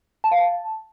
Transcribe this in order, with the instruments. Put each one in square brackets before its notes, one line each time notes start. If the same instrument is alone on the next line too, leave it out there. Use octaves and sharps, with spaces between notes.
[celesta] A5
F5
A5